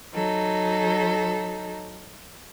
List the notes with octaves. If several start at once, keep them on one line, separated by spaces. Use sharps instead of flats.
F#3 D#4 A4